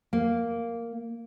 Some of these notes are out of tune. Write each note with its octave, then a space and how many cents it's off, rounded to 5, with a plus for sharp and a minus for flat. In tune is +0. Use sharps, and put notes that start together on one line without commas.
A#3 -5